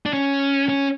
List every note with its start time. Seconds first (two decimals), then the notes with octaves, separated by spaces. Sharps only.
0.06 D4
0.13 C#4
0.69 C#4